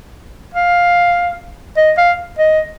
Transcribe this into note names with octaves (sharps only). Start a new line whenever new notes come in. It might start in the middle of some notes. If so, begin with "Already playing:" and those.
F5
D#5
F5
D#5